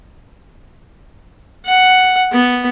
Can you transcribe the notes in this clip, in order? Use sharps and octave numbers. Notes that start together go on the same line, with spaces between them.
F#5
B3